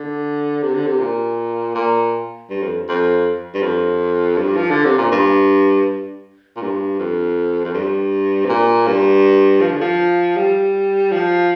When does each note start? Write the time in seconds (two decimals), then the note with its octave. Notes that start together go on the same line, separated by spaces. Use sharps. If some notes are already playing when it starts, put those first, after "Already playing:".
Already playing: D3
0.63 C3
0.75 D3
0.87 C3
1.00 A#2
1.75 A#2
2.50 G2
2.63 F2
2.89 F2
3.54 G2
3.63 F2
4.38 G2
4.57 F3
4.71 D3
4.85 C3
4.98 A#2
5.12 G2
6.57 A#2
6.62 G2
6.99 F2
7.65 F2
7.74 G2
8.45 C3
8.50 A#2
8.87 G2
9.62 F3
9.71 D3
9.81 F3
10.37 G3
11.12 F3